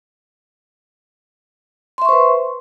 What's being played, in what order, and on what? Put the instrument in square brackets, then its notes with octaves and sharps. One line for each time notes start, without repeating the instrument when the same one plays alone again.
[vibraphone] C6
E5
C#6
C5
B4